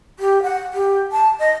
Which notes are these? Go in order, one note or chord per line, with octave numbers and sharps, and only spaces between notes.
G4
F#5
G4
A5
D#5